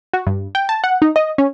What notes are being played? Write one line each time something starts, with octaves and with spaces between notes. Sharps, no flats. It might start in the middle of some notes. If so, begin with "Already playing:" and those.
F#4
G2
G5
A5
F#5
D#4
D#5
C#4